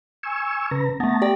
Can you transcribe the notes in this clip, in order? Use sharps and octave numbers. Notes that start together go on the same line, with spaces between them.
G#5 C#6 E6
C#3 B4 A#5
A3 B3 A5 A#5
G4 D5 G5